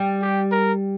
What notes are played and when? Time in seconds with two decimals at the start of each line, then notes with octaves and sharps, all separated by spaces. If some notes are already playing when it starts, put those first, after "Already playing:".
Already playing: G3
0.22 G4
0.52 A#4